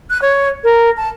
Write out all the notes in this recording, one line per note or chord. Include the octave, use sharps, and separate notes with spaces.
F#6
C#5
A#4
A5